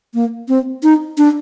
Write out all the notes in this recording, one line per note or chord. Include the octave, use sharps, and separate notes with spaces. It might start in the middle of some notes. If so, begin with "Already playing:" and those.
A#3
C4
D#4
D4